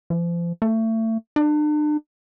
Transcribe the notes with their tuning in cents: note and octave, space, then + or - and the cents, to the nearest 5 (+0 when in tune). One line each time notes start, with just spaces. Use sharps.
F3 -35
A3 +30
D4 +40